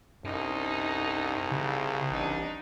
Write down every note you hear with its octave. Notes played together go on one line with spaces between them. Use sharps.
C2 F#2 D#4 A4
C#3
A1 D4 D#4